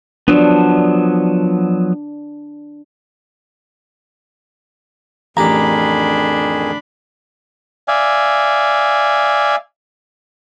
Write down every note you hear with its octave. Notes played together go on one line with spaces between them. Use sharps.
F3 F#3 B3 D4
A1 F2 D#3 D4 G4 G#4 A#5 B5
D5 E5 F5 G#5